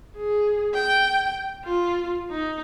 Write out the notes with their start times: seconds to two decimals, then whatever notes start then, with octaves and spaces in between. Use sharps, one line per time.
0.17 G#4
0.74 G5
1.65 F4
2.30 D#4